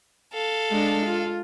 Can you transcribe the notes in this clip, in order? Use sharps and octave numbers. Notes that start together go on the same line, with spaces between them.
A4 F5
G#3 D4
F4